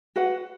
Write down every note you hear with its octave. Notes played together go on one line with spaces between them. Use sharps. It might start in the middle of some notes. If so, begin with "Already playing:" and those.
F#4 B4 F#5